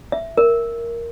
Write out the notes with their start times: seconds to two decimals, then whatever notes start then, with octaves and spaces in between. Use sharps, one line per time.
0.12 E5
0.37 A#4